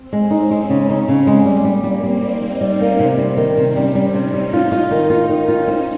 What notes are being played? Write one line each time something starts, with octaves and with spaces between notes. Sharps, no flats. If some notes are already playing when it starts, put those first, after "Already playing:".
Already playing: C4
G#3
C#4 D#4
G#3
C#3
D#4
C#3 C#4
G#3
G3 A#3
G3
G3 C4
G3
G3 D#4
G3
G3 C#4
A#3
C3 C4
G3
D#3 C#4
C3
G3 C#4
G3
C3 D#4
G3
F4
F4
D#3
F4
D#3 C#4
F4
C4